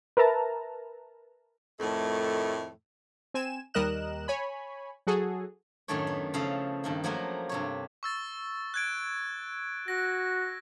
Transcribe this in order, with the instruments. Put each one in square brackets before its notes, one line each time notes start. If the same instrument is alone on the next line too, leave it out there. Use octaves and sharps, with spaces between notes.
[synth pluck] A#4 B4 E5 A5 A#5
[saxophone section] F2 A2 D#3 A3
[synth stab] C4 G#5 E7
D#2 G3 A#4 D#5 F#6 E7
C#5 G#5 B5
F#3 F#4 G#4 A4
[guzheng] F#2 A2 D#3 A3 D4 C#5
B3
C#3 F3 E4 A4 F5
G2 D#3 A#3
F3 F#3 A3 A#3 G4 A#4
G2 C3 C#5
[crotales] C#6 E6 A6
F#6 G#6 D7
[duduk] F#4 [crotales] A#6